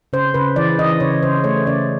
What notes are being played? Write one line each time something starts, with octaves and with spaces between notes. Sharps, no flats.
C#3 C5
C#3 B4
E3 D5
E3 D#5
C#3 C#5
C#3 C5
A3 C#5
C#3 D5